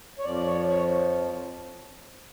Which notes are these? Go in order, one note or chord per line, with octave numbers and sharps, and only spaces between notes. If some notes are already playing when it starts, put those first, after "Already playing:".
C#5
F2 F3 D5
D5
C#5
C#5